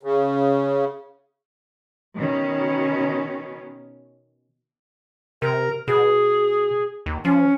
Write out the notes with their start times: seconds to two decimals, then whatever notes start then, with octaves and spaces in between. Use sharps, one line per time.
0.03 C#3
2.17 B2 D#3 C#4
5.42 C3 A#4
5.88 B2 G#4
7.06 D#2
7.25 F3 C#4